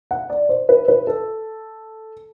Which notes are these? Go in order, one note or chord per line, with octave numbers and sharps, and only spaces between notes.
F#5
D5
C5
B4
B4
A4